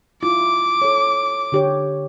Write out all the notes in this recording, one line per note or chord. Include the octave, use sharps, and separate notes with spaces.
E4 F4 D6
A4 C#5
D3 G4 C#5